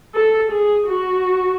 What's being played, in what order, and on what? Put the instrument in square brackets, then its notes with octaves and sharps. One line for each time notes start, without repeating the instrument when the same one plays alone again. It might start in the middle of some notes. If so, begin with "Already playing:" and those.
[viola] A4
G#4
F#4